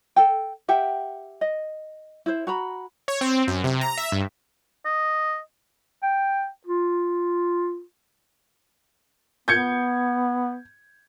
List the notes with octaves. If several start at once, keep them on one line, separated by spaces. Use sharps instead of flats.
A4 G5
G4 E5 F#5 G5
D#5
E4 C5
F#4 A#5 B5
C#5
C4
F#2
C3
A#5
E5
G2
D#5
G5
F4
B3 G6 G#6 C#7